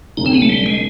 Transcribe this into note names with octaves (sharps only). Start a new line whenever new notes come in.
E1 D#2 C#3 D#4
C4
B3
A3
G3
G#3